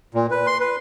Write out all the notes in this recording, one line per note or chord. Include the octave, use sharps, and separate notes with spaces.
A#2
B4
C6
B4